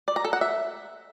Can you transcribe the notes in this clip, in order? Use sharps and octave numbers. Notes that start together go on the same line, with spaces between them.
D5
A#5
A4
F#5
E5